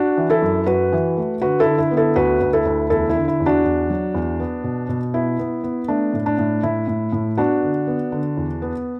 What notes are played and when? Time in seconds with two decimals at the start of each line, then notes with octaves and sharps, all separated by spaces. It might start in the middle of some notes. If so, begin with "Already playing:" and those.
Already playing: D4 F#4
0.17 E3
0.30 E4 A4
0.42 F#2
0.66 F#2 F#4 B4
0.92 E3
1.17 A3
1.41 D3 F#4 B4
1.60 E4 A4
1.66 D3
1.78 E4
1.91 B3
1.97 E4 A4
2.16 D2 F#4 B4
2.41 D2
2.53 E4 A4
2.65 D2
2.90 E2 E4 A4
3.09 E4
3.15 D3
3.28 E4
3.40 E2
3.46 D4 F#4
3.65 E2
3.90 F#3
4.14 E2
4.40 B3
4.64 B2
4.89 B2
5.14 B3 E4
5.39 B3
5.64 B3
5.88 A3 D4
6.13 A2
6.26 D4
6.39 A2
6.63 A2 E4
6.88 A2
7.13 A2
7.37 B3 D4 F#4
7.62 D3
7.87 B3
8.12 D3
8.37 E2
8.62 B3